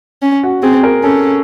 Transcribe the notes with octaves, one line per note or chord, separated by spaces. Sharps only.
C#4
F#4
C4 G#4
A#4
C#4 A4